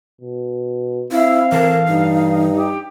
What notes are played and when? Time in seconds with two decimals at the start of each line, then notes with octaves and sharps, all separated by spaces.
0.21 B2
1.12 C4 E4 F5
1.52 E3 A4 A#4 A5
1.88 G2 D#4
2.55 G4